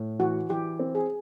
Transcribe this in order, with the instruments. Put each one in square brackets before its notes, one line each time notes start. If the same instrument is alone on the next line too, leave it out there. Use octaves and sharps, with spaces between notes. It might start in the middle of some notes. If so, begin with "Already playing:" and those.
Already playing: [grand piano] A2
[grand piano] E3 [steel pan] F#4
[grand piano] E3 [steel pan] G4
[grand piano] C4
[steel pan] G#4